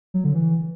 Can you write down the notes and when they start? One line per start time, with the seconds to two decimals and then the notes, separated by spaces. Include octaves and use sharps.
0.14 F#3
0.24 D3
0.34 E3